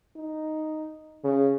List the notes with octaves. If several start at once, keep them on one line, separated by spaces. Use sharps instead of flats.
D#4
C#3